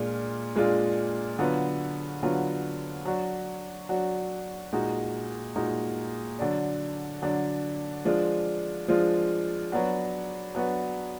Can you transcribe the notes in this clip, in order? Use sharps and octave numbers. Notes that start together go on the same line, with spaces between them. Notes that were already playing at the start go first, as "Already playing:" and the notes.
Already playing: A#2 G#3 D4 F4
A#2 G#3 D4 F4
D3 F#3 B3 F4
D3 F#3 B3 F4
F#3 D4 F#4
F#3 D4 F#4
A#2 G#3 D#4 F#4
A#2 G#3 D#4 F#4
D3 F#3 D4
D3 F#3 D4
F3 G#3 D4 F4
F3 G#3 D4 F4
F#3 B3 D4 F#4
F#3 B3 D4 F#4